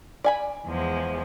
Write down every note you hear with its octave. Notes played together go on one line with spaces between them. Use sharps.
D5 G#5 B5
E2 F3 G#3